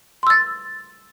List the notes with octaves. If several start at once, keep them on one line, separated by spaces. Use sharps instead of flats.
C6 E6 A6